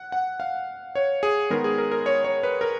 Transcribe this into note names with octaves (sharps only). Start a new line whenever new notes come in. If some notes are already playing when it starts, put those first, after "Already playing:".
Already playing: F#5
F#5
F5
C#5
G#4
D#3 G#3 B3 A#4
G#4
A#4
A#4
C#5
C#5
B4
A#4